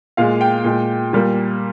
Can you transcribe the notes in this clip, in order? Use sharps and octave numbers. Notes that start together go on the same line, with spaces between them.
A#2 G#3 F5
G5
A#2 G#3
A#2 G3 A#3